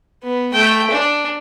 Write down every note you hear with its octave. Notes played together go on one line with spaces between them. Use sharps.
B3
A3 G5
D4